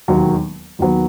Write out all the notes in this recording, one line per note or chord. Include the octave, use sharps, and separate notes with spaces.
E1 D#2 D#3 F#3
D#2 D#3 F#3 B3